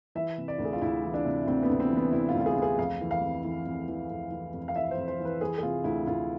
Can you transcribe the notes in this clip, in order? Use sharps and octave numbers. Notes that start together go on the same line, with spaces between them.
E3 E5
C3
D5
D2
G#4
F4
D2 E4
E3
D4
C3
D2 C4
B3
D2
C4
E3
B3
C3 E4
F4
D2
F4
G#4
D2
G#4
F2 F5
E3
F5
F2
E3
F2
E3
F2
E3
F2
F5
E3 E5
C5
F2
C5
E3
B4
E3 G#4
G#4
C3 F4
D2 E4
D2 F4